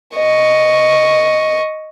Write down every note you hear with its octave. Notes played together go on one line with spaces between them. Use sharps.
D#5 C#6